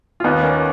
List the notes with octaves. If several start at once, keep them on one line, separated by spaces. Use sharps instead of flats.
F4
D#2 B3 D#4
A#3 C#4